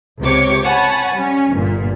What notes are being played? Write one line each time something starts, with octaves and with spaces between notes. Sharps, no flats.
C#2 C3 G4 C#5 D6 C#7
C#5 F#5 G#5 A5 B5
G3 C#4
G1 A#2